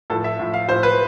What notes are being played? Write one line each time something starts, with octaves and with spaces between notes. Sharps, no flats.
A2 F3 A4
E5
A2 F3
F5
A2 F3 C5
B4